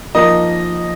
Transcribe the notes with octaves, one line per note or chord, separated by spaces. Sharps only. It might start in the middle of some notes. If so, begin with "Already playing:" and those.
F3 A#3 D#4 D#5